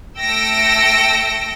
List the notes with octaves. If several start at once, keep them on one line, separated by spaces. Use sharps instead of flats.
A3 G5 E6 A#6 C#7 D7